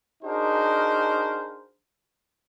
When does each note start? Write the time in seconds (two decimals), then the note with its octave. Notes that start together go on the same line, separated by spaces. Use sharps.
0.24 D4 D#4 F#4 G#4 A#4 C5